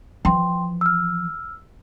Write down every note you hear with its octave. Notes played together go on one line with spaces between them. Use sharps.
E3 F3 G5 C6
E6 F6